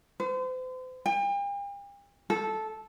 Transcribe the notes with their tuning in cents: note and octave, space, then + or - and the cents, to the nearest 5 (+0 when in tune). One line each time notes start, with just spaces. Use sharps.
C5 -40
G5 +45
A4 -10